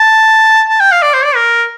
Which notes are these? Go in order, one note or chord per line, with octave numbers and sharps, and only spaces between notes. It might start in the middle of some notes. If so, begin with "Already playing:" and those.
Already playing: A5
A5
G5
F5
D5
C5
D5
A#4